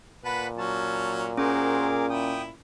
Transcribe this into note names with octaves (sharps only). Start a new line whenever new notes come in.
A#2 B4 F#5 A5 B5
F#3 C#4 A5
C#4 F#4 G#4 A#4 C5 D6
E4 G5 D#6